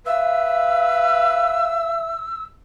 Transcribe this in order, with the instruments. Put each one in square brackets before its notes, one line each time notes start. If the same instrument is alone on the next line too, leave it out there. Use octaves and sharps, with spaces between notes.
[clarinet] B4 [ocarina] E5 [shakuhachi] F5 [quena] E6